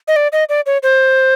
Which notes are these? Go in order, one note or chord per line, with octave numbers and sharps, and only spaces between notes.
D#5
D5
D#5
D5
C#5
C5